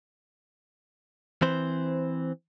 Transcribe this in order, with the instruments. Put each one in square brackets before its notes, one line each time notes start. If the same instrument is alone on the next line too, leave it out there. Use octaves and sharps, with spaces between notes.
[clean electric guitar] E3 C4 C5